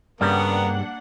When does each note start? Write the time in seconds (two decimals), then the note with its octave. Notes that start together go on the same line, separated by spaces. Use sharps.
0.21 G2 C#3 G3 A#3 B3 D4 A#4 F#5